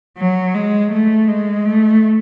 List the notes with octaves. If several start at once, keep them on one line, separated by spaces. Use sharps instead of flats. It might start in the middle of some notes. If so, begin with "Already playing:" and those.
F#3
G#3
A3
G#3
A3